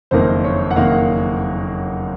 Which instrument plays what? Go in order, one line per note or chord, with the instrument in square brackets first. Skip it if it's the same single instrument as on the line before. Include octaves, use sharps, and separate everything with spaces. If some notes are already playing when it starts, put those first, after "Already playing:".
[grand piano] F#1 F2 D#3 A#3 C5
C#5
F#5
F#1 F2 D#3 A#3 F5
F#5